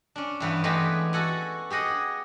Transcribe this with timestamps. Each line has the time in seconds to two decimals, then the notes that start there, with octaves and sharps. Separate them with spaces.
0.16 C#4 D4
0.40 G2 E3 B3
0.64 E3 G#3 A3 G4 G#4 B4
1.13 F#4 A4 F#5 G#5
1.70 G4 G#4 D#5 F#5